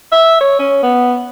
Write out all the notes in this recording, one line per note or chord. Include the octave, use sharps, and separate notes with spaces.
E5
C#5
C#4
B3